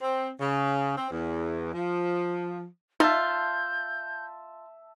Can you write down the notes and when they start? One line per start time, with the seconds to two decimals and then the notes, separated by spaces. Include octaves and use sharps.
0.01 C4
0.40 C#3
0.97 C4
1.11 E2
1.74 F3
3.00 D#4 F4 E5 A5 G6